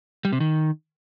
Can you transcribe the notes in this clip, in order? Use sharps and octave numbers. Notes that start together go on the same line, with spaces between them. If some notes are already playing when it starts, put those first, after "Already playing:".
G3
C3
D#3